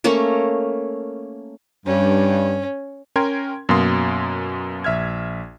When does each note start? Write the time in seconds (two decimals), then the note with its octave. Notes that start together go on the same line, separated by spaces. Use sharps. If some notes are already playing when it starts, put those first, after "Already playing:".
0.04 A3 A#3 C#4 A#4
1.86 G2 C#4
3.16 C#4 A#4 G5 C6 G#6
3.69 F#2 B2 A#3 F5 C6 D#6
4.84 A#1 E5 F6 G#6